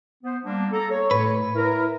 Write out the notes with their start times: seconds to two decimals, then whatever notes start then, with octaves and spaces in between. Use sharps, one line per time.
0.23 B3 C5
0.43 G3 A#3 D4
0.72 A4 A#5
0.90 C#5
1.11 A2 B4
1.54 E4 A#4